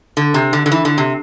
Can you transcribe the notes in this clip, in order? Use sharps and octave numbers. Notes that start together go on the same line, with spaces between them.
D3
C3
D3
D3
E3
D3
C3